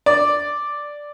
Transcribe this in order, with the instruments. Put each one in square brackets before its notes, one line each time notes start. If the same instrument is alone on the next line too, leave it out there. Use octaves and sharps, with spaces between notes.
[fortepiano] D5